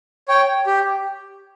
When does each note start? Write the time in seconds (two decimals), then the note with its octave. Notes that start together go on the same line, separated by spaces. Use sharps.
0.28 C#5 G5
0.66 G4